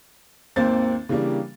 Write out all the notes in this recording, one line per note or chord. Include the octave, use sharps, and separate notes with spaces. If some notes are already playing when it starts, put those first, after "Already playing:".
G#1 D#2 A#3 C4 C5 A6
C#3 E3 G3 A#3 D4